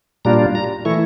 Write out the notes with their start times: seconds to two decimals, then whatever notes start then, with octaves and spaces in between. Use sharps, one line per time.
0.25 A#2 G3 D4 F4 A#5
0.55 A#5
0.85 E3 A3 E4 C#6